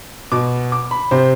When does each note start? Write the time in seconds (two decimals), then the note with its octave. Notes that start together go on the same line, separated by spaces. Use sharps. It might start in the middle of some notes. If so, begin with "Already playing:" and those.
0.32 B2 D6
0.72 D6
0.91 B5
1.11 C3 C5